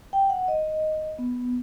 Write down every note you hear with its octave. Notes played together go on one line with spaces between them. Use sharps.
G5
F#5
D#5
B3